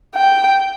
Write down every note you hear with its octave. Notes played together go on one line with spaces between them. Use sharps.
G5